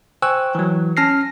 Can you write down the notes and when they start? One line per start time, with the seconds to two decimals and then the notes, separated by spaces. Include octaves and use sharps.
0.22 C5 G5 G#5 C#6 E6 F#6
0.55 E3 F#3
0.97 C#4 A5 F6 A#6 C7